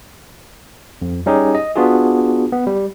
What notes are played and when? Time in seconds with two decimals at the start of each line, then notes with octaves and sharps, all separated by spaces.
1.02 F2
1.26 G3 C#4 D#4 G4 G#4
1.55 D#5
1.76 B3 D4 F4 F#4 G#4
2.52 B3
2.67 G3